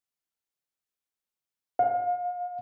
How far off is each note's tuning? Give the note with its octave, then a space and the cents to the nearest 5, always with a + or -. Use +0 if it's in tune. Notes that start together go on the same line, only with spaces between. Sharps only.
F5 +35